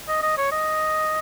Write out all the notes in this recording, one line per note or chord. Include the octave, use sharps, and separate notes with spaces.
D#5
D#5
C#5
D#5